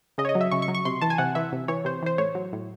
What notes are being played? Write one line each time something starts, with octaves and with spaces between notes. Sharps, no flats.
C#3 D#5
C#5
D#5
F#3
E5
C#3 C#6
C#6
F#3
C#6
C3 C6
E3 A5
G#5
C3 F#5
E3 E5
C3
E3 C#5
C3 C5
E3 C5
A2 C#5
F#3
A2